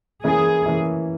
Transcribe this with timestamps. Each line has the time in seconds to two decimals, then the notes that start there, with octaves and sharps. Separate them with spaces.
0.24 E3 A#3 C#4 E4 G#4
0.66 E3 A#3 C#4 E4